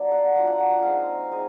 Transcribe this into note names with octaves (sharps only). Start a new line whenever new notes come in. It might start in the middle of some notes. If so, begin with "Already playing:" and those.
Already playing: F#3 A#3 D4 D5
F#5
F#3 A#3 D4 F4 F#5
F#5
G5
F#5
G#3 C4 D#4 F5
G#3 C4 D#4